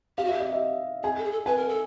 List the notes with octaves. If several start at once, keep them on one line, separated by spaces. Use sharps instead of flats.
G4 F5
F#4
G4 E5
D#5
E5
G#4 G#5
A4
G#4
A4
B4 G#5
A#4
A4